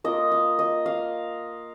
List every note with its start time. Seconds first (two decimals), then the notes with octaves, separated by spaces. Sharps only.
0.04 A#3 F4 D#5
0.32 F5
0.59 D#5
0.86 F5